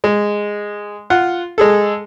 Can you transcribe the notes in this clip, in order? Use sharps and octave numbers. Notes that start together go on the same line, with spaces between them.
G#3
F4 F#5
G#3 G#4 A4